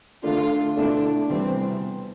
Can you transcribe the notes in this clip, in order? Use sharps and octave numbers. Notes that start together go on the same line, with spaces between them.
D3 A3 D4 F4
B2 A3 D4 E4
E2 C3 G3 B3 C4